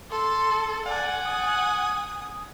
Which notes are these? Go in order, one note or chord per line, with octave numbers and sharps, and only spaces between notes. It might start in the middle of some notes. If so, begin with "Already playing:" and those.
A4 C6
D5 F#5 G#5
D#6